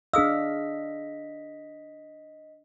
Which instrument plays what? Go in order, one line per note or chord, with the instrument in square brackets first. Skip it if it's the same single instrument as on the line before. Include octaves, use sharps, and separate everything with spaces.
[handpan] D4 F5 [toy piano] G#4 D#6 E6 [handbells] D#5 B6